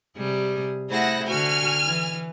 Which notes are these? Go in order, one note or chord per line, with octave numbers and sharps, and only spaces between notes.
C3 G3 G#4
A3 E4 G#4 C5 F#5 A#6
D3 F#4 G#5 F6
E3